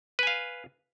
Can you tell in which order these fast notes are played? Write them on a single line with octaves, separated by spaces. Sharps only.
B4 G#5 F5